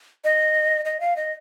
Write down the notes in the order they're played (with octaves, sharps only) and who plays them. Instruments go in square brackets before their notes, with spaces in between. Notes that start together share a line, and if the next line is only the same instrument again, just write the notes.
[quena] D#5
D#5
F5
D#5